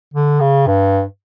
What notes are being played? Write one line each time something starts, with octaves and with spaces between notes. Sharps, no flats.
D3
C#3
G2